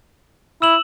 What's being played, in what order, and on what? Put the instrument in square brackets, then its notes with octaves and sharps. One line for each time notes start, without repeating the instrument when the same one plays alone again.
[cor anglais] E4 [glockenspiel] E6 E7 F#7